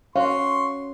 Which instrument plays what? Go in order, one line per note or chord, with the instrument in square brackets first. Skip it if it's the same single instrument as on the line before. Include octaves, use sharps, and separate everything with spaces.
[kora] C#4 F#4 [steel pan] F5 [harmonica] C6 C#6